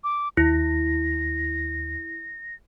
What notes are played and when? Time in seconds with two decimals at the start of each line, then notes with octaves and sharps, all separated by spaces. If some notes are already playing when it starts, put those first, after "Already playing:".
0.04 D6
0.37 D#2 E4 A#6